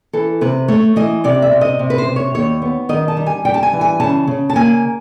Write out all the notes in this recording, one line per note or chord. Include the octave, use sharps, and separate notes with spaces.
E3 A4
C3 B4
A3 C#5
E3 D#5
C3 D5
E5
C3
D#5
C3
B4
C5
C3
C#5
D#2 C#5
B3
D#3 D#5
A5
G3
G#5
G3 G5
A5
G#5
E3
G#5
C#3 A5
C#3
A5
A#3 G#5